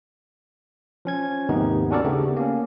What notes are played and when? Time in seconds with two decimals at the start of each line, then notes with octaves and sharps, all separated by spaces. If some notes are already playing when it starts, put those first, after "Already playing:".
1.05 F3 C#4 G#6
1.49 D#2 G#2 C3 D#3 B3 D#4
1.90 C#4 D4 F#4 A4 A#4 D5
2.04 C#3 A3 B3 G4
2.37 A#3 C#4